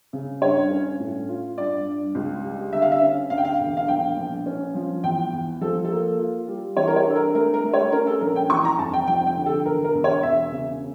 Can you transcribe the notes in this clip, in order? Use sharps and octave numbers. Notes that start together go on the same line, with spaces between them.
C#3
G2 C#5
C#4
A2
F4
G2 D5
G2
C#2
G3
D3 E5
F5
E5
C#4
D2 F5
G5
F5
E1
F5
A#1 G5
A#1
C#4
F3
E2 G5
E2
F3 A4
A4
A#3
F4
G3
E3 C#5
A#4
C#5
D4 A4
A#4
A3 A#4
A#4
A3
C#5
C#4 A#4
A4
A#1 A#4
G5
E3 C#6
A#5
F1 A5
G5
F3 G5
G5
D3
A4
E1 A#4
A#4
E1
C#5
E1 E5
C#3